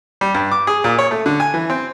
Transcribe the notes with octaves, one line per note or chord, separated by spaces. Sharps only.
G3
G2
D6
G#4
A#2
C#5
A3
D3
G#5
E3
C4